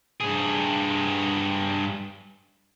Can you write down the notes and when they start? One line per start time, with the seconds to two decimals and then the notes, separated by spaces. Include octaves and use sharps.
0.21 G2 G#4